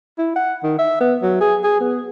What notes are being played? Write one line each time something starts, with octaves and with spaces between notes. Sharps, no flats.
E4
F#5
D#3
E5
B3
F#3
G#4
G#4
B3